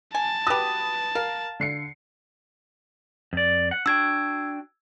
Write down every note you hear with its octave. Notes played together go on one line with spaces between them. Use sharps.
G#5 A5
F#4 G4 B4 D#6
A#4 F5
D3 C7 C#7
F2 D5
F#5
D4 F#4 G5 E6 G#6